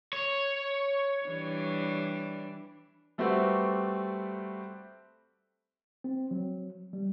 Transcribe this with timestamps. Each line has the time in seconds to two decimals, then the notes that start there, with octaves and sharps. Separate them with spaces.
0.13 C#5
1.26 E3 G3 D4
3.18 G3 A3 C4 F#4 G4 B4
6.04 C4
6.31 F#3
6.93 G3